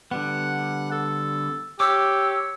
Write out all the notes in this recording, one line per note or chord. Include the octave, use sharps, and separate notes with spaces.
D3 G3 B3 F#5
A4
G4 C#5 D6 E6